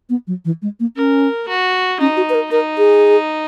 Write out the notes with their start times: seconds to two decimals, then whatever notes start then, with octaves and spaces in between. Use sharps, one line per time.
0.10 B3
0.27 F#3
0.45 E3
0.62 G#3
0.80 A#3
0.96 C#4 A#4
1.48 F#4
2.00 C#4 D#4
2.17 F#4
2.30 B4
2.34 A#4
2.51 D#4 A#4
2.78 G#4